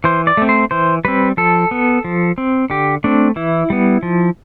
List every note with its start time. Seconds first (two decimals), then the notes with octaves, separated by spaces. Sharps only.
0.04 E3 C5
0.27 D5
0.37 A3 C4
0.49 C5
0.71 E3 C5
1.05 G3 C4 B4
1.37 F3 A4
1.71 B3
2.04 F3
2.38 C4
2.70 D3 G4
3.04 A3 C4 D4
3.36 E3 E4
3.70 G3 B3
4.03 F3